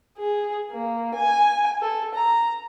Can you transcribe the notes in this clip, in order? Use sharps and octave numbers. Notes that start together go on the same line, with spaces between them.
G#4
A#3
G#5
A4
A#5